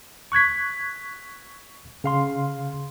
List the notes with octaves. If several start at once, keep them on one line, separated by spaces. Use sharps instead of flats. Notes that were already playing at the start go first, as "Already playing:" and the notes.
C#6 F#6 G#6 B6
C#3 F5 C6